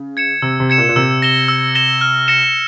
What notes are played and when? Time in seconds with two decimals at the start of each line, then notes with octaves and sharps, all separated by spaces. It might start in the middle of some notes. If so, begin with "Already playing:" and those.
Already playing: C#3
0.17 G#6 C#7 E7
0.42 C3 E6
0.60 C3
0.70 G#6 C#7 E7
0.78 A#2
0.89 A#2
0.96 C3 E6
1.22 A#6 E7 G7
1.48 E6
1.75 A#6 E7 G7
2.01 F6
2.28 A#6 C#7 E7